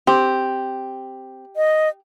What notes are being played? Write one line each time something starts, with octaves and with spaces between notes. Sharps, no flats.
C4 G4
D#5